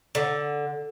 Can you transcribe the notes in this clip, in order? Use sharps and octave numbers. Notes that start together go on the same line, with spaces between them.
D3